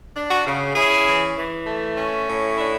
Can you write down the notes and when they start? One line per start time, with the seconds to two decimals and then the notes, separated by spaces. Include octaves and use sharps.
0.16 D4
0.30 F#4
0.46 C#3
0.75 C#4 E4 G#4
1.06 E3
1.37 E3
1.67 A3
1.97 C#4
2.28 A2
2.58 D4 E4